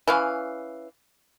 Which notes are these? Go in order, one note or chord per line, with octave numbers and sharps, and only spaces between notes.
E3 C#4 F5